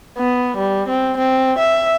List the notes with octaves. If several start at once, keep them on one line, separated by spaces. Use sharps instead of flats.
B3
G3
C4
C4
E5